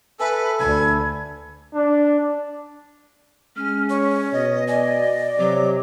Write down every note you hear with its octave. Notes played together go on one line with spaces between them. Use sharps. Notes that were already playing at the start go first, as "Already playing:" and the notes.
A4 B4 E5 G#5
D2 B5 G#6
D4
G#3 C#4 F6
C#5 C#6
B2 D#5
D5 D#5 G#5
C3 F#3 D6